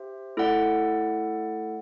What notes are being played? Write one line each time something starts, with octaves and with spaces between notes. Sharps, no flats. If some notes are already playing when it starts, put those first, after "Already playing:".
Already playing: G4 C5 E5
A3 E4 A4 D5 F#5